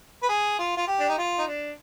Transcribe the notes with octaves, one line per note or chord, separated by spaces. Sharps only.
B4
G#4
F4
F4
G4
D4
D#4
F4
D#4
D4